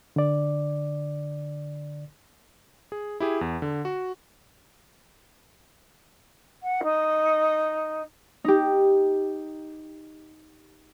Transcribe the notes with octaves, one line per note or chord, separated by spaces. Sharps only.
D3 D5
G#4
E4 G4 G#4
E2
D3
F#4
F#5
D#4
D#4 G4